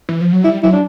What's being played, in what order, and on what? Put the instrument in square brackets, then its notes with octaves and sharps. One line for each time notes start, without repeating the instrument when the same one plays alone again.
[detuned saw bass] E3
F3
F#3
[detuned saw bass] G3 [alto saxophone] E4
[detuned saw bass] F#3 [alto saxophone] E4
[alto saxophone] D4